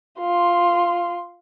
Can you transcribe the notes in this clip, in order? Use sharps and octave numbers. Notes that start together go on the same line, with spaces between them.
F4 C6